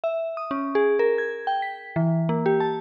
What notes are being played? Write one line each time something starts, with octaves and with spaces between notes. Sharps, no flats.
E5
D#6
C#4
G#4
A#4
G#6
G5
B6
E3
A#3
G4
A5